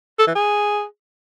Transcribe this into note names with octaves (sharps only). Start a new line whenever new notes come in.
A4
E3
G#4